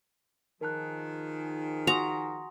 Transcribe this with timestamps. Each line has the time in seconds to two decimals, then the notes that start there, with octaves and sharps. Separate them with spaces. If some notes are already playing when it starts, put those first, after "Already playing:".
0.61 D#3 F3 G#4 A#4 A5 F#6
1.87 F#4 G#5 A#5 C6 D#6